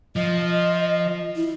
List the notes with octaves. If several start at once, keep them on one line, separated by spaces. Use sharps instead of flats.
F3 D#5
E4